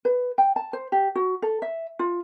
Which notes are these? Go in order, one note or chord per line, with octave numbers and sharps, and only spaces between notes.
B4
G5
A5
C5
G4
F#4
A4
E5
F4